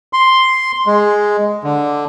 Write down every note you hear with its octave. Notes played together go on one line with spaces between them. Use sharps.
C6
G#3
D3